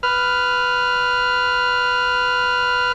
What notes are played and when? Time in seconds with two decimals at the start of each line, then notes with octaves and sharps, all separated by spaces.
0.03 B4 F6